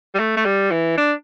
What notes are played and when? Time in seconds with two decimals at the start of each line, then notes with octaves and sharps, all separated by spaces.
0.15 G3
0.19 A3
0.37 A3
0.45 G3
0.71 E3
0.97 D4